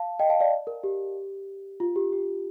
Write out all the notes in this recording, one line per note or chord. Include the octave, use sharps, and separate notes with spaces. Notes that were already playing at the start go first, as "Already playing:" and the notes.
Already playing: F5 A5
D#5 G5
F5 A5
D5 F5
A#4
G4
F4
G4
G4